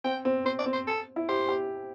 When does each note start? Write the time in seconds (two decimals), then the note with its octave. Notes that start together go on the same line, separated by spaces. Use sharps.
0.04 C4 G5
0.25 C4
0.45 C4 C5
0.59 D5
0.66 C4
0.73 C5
0.87 A4
1.16 E4
1.28 G4 C5
1.49 G4